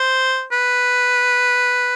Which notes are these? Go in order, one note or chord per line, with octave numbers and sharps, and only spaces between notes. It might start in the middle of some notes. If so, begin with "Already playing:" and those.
Already playing: C5
B4